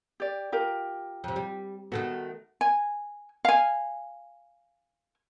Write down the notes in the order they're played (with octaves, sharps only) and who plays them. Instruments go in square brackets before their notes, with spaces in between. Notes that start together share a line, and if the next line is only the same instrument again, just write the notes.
[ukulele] G4 D5
F4 G4 A#4
[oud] F2 C3
G3
[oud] D#3 A3 B3 [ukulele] F#4
[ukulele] G#5
F5 G#5